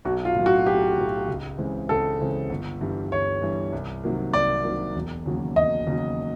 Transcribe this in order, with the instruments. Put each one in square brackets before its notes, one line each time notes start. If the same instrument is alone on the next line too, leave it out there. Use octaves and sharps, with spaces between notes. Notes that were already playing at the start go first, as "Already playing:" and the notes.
[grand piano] B1 [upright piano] F#4
[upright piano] F4
[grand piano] A2 F#3
[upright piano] F#4
[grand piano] B1 [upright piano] G4
[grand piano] A2 F#3
C#2
C#3 E3 G#3 C4
[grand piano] C#2 [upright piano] A4
[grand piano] C#3 E3 G#3 C4
G1
G2 E3 G3
[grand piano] G1 [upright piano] C#5
[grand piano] G2 E3 G3
C2
C3 D#3 F#3 A#3
[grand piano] C2 [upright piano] D5
[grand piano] C3 D#3 F#3 A#3
E1
D#2 C#3 F#3
[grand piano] E1 [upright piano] D#5
[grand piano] D#2 C#3 F#3